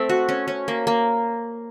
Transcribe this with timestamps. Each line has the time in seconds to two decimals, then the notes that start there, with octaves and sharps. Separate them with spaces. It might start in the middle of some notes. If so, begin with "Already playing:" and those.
Already playing: A3 C4
0.09 F#4
0.29 C#4
0.48 C#4
0.68 A#3
0.87 A#3